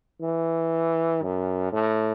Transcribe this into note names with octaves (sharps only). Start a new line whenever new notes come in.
E3
F#2
A2